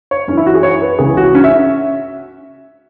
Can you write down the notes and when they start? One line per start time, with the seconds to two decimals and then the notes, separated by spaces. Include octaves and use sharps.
0.11 C#5
0.28 F#2 E3 C#4
0.37 E4
0.46 F#4
0.55 G#4
0.63 C#5
0.82 B4
0.99 C#2 C#3 E3 G#4
1.17 F#4
1.35 C#4
1.44 E5